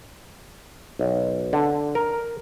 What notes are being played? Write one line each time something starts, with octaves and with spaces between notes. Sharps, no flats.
B1
D3
A#4